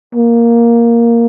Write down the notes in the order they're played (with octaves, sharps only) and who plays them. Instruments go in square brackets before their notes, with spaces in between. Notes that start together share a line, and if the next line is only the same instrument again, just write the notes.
[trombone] A#3